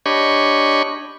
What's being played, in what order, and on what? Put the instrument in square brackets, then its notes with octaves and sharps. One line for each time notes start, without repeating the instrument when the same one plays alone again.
[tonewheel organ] D4 G4 C#5 D#5 B5 C#6